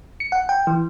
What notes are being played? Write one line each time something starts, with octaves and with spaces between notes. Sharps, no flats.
C#7
F#5
G5
E3